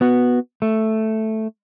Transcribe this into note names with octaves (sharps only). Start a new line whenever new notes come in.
B3 F#4
A3